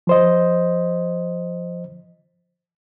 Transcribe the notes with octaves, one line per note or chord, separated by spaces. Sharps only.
F3 C5 D#5